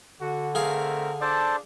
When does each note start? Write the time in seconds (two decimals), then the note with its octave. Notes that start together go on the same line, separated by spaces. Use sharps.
0.21 D3 F#4
0.55 A3 C4 G#4 A#4 F5
1.21 D4 A4 C5 D5 A5